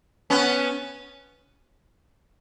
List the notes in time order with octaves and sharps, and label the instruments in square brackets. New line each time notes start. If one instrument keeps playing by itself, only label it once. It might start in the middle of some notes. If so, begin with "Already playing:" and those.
[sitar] B3 C#4